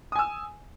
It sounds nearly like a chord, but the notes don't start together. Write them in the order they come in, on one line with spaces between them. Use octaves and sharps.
D#6 G#5 E6